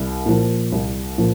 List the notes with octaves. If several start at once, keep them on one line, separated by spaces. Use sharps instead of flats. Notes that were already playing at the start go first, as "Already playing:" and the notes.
Already playing: C2
A#2 F3
C2
A#2 F3